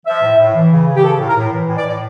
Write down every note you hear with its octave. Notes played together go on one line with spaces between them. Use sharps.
F3 E5
A2
A2
E3
C#3
C#3
G4
E3 A4
A2
A#4
A2
E3
A2
D5
A2